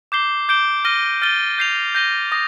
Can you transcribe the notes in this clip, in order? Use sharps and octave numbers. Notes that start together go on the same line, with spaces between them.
D6 G6 C7 G7
D6 G6 D7 G7
F6 A#6 D#7 G7
F6 A6 D#7 G7
G6 C7 F7
G6 A#6 D#7 G7
D#6 A#6